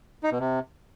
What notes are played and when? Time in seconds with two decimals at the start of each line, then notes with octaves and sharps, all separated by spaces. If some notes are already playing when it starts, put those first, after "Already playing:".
0.23 D#4
0.32 B2
0.40 C3